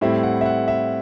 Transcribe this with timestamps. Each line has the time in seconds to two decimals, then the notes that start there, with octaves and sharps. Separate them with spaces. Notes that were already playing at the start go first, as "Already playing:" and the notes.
0.01 A2 G3 C4 E4 E5
0.23 F#5
0.41 E5
0.45 F#5
0.68 E5